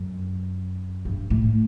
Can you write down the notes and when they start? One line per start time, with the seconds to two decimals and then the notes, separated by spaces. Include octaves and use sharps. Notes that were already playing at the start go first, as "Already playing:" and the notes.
Already playing: F#2
1.05 G2
1.30 A2